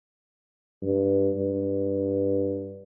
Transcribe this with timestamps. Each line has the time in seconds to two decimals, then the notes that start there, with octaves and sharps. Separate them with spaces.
0.82 G2
1.36 G2